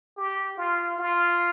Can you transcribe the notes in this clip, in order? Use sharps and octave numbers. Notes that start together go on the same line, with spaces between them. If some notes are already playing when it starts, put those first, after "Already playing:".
G4
F4
F4